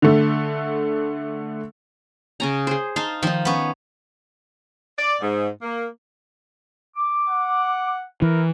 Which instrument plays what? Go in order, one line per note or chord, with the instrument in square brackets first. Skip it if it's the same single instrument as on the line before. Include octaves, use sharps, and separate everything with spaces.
[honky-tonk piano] D3 A3
[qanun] C#3 C#4 A#5
G#4 C5
[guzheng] D#4 [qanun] F5 A5 C6
[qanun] D#3 D#4 [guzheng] F3
[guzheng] B3 C#4
[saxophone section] D5
G#2
A#3
[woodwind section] D6
[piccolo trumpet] F#5
[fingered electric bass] E3 [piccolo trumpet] A#4